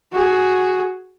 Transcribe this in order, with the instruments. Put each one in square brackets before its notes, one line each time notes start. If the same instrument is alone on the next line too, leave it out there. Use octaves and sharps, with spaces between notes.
[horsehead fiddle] F#4 G#4